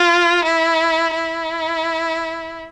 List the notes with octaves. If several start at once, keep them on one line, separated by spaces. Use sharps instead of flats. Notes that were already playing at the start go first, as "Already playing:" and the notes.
Already playing: F4
E4
E4